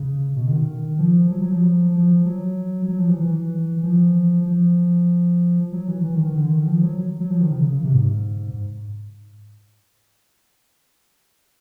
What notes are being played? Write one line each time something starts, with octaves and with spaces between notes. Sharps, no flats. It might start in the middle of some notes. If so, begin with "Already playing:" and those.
Already playing: C#3
B2
D3
D#3
F3
F#3
F#3
F3
F3
F#3
F#3
F3
E3
E3
F3
F3
F#3
E3
E3
D#3
D#3
D3
D#3
F3
F#3
F#3
F3
D#3
C#3
C#3
C3
G#2